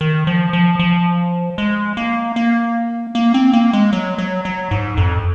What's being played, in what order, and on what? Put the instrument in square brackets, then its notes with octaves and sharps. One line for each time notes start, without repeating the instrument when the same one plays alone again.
[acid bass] D#3
F3
F3
F3
G#3
A#3
A#3
A#3
C4
A#3
G#3
F#3
F#3
F#3
G#2
F2